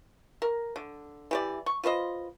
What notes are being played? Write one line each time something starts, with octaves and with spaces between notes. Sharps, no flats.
A#4
D3
E3 G4 D5
C#6
F4 B4 C5 D#5